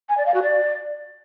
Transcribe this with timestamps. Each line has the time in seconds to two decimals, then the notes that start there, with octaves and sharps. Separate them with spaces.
0.09 G#5
0.18 D5
0.26 F5
0.34 F#4
0.43 D5